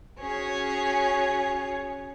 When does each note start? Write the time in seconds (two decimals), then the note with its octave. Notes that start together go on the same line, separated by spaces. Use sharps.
0.20 C#4 F#4 G#4 C#5